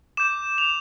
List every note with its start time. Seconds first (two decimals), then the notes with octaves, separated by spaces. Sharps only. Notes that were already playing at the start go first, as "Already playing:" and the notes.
0.17 D6 G6 E7
0.58 F7